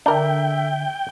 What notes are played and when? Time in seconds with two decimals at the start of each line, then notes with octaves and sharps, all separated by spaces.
0.06 D3 D4 A#4 E5 G5